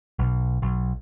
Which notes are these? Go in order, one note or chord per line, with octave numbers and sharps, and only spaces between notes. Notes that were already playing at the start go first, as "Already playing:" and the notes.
B1
B1